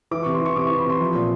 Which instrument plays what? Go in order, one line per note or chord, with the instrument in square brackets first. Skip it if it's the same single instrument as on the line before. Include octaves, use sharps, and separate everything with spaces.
[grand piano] E3 D6
C3 C#6
C6
E3 C#6
C3 D6
E3 C#6
B5
C3 C6
F3
A#2